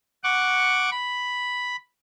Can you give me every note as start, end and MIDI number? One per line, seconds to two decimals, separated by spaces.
0.24 0.90 78
0.24 0.90 85
0.24 0.90 86
0.91 1.76 83